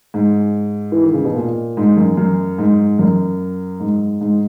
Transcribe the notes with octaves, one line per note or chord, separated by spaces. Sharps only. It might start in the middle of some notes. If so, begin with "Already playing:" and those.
G#2
E3
D#3
C#3
B2
A#2
G#2
F#2
F#2
G#2
F#2
G#2
G#2